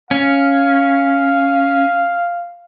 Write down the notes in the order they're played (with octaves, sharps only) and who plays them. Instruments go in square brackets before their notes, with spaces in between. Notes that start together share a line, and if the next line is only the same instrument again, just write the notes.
[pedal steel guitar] C#4 [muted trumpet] F5